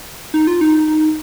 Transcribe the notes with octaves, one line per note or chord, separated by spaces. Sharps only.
D#4
F4
D#4